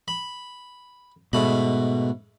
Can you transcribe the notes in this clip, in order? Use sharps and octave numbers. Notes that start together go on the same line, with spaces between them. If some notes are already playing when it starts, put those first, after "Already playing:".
B5
G#2 B2 A3 B5